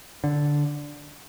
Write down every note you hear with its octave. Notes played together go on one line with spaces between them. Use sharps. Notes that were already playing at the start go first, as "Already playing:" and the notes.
D3